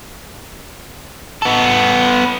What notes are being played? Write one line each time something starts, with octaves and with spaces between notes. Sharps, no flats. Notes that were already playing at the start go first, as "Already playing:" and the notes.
B3 A4